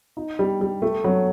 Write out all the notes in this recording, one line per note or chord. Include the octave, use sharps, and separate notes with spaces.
D#4
G3
G3
A3
F#3